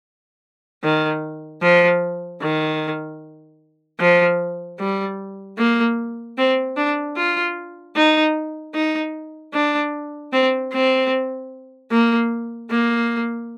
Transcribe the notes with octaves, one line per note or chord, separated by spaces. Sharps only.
D#3
F3
D#3
F3
G3
A#3
C4
D4
F4
D#4
D#4
D4
C4
C4
A#3
A#3